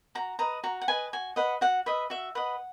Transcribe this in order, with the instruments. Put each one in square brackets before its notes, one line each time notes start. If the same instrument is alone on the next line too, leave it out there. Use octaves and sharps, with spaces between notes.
[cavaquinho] F#4 A#5
B4 D#5 A#5
F#4 A#5
F#5
B4 D#5 G#5
F#4 G#5
B4 D#5 F#5
F#4 F#5
B4 D#5 E5
F#4 E5
B4 D#5 F#5